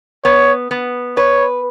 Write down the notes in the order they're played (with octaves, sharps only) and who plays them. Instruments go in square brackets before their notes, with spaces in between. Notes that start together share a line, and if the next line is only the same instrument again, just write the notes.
[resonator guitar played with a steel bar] B3 [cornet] C#5
[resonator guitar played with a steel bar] B3
[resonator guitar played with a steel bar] B4 [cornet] C#5